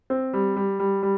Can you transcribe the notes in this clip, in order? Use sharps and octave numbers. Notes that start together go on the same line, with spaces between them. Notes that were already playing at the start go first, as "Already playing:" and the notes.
C4
G3
G3
G3
G3